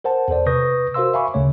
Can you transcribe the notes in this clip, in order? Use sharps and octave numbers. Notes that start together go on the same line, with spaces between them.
A#4 C5 F#5 A5
E2 A4 C5 D5
C3 B4 C#6 D#6 G6 A#6
F#4 A#4 C5 F5 C6 E6
E5 F5 G#5 B5 C#6 D6
D2 C#3 A3 C#5